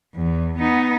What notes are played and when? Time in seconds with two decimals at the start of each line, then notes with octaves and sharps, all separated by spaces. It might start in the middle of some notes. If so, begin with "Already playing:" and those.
0.15 E2
0.59 B3 D#4